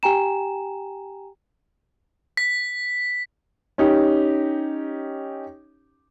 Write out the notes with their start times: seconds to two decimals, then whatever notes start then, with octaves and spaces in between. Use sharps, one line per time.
0.03 G4 G5 G#5 A#5 E7
2.37 B6
3.78 C#4 D#4 G4